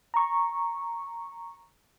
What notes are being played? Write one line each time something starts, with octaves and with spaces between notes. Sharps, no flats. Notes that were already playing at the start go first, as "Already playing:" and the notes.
A#5 C#6